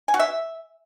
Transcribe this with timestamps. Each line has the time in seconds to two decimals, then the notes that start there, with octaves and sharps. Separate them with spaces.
0.08 G#5
0.14 F#4
0.19 E5